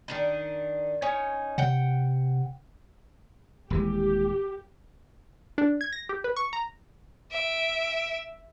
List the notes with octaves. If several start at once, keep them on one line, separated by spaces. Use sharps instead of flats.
D#3 D4 D#4
C#4 D#4 C#5
C3 F#5 G5
D#1 E3 G#3 G4
D4
G#6
A#6
G4
B4
C#6
A#5
E5 D7